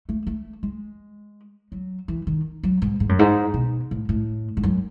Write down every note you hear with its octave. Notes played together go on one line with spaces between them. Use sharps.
A3
A3
G#3
F#3
E3
D#3
F#3
G#2
G#2
F#2
G#2
B2
A2
A2
G#2
F#2